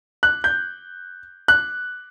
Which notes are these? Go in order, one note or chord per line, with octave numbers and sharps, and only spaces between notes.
F#6
G6
F#6